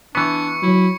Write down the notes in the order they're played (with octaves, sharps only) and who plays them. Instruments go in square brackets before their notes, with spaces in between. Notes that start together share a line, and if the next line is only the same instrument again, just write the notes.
[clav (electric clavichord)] E3 B3 [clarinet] D4 [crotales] C#6 C#7
[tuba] F#3 [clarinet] E4